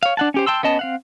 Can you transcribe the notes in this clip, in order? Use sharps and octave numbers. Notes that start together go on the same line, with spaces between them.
C#5 F5
D4 F#5 A5
C#4 G4 C5
G5 A5 C6 E6
B3 C#4 D#5 A5
C4 F5 F#5